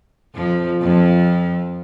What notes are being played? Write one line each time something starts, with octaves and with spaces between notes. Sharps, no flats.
F2 F3
F2 F3